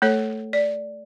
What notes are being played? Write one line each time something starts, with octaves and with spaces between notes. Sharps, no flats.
A3 A4 C#5
D5